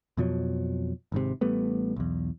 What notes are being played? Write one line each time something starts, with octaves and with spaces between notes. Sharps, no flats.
F2 B2 F3 F#3
G#1 G#2 C3
A1 G3 A3 B3
B1 E2